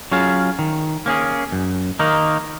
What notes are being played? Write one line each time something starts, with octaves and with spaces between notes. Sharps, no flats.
F#3 C#4 F4 G#4
D#3
A#3 C#4 G#4
F#2
D#3 A#3 D#4